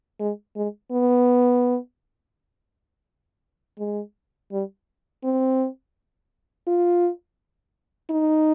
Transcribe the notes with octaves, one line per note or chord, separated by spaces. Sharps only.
G#3
G#3
B3
G#3
G3
C4
F4
D#4